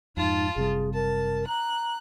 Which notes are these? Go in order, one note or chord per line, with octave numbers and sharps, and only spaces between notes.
F2 G#2 D#4 F4 A5
F#1 C3 G3 G#4
A#4 A5
A#5 F#6